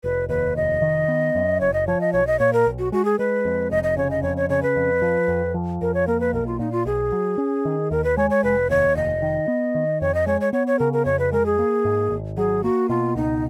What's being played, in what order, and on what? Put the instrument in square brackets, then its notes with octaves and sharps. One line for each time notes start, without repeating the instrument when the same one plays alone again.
[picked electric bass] F1 [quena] B4
[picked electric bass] D#2 [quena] B4
[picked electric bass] F1 [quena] D#5
[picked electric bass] D#3
B3
F#2
[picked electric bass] F#1 [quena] C#5
[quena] D#5
[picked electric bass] F3 [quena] C#5
[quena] D#5
[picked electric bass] B1 [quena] C#5
[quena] D#5
[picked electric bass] A#2 [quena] C#5
[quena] A#4
[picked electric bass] B1
[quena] F#4
[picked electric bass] G#3 [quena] F#4
[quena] G#4
[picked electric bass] G#3 [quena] B4
[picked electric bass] F2
[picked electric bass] F1 [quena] D#5
[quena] D#5
[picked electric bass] C#3 [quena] C#5
[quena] D#5
[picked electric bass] F2 [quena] C#5
[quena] C#5
[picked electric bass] C#3 [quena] C#5
[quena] B4
[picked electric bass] F2
F3
F2
F3
[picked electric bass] F2 [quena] A#4
[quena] C#5
[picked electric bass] A#3 [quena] A#4
[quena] B4
[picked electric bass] B1 [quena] A#4
[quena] F4
[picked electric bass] A#2 [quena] D#4
[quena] F4
[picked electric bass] B1 [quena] G#4
[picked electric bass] F#3
C#4
D#3
[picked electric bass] D#2 [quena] A#4
[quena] B4
[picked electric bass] G#3 [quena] C#5
[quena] C#5
[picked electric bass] F1 [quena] B4
[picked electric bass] D#2 [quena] C#5
[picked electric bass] F1 [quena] D#5
[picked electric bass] D#3
B3
D#3
[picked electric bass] F2 [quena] C#5
[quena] D#5
[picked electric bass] G#3 [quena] C#5
[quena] C#5
[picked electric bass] B3 [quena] C#5
[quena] C#5
[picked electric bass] C#3 [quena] A#4
[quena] A#4
[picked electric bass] F2 [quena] C#5
[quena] B4
[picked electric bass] G#3 [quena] A#4
[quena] G#4
[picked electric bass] A#3
G#2
G#1
[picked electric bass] F#3 [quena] G#4
[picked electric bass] A#3 [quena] F#4
[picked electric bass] B2 [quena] F4
[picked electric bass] C#2 [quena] D#4